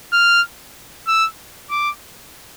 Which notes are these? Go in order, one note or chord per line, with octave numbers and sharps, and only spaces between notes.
F6
E6
D6